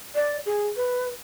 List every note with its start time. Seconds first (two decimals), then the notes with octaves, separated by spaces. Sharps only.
0.15 D5
0.46 G#4
0.76 B4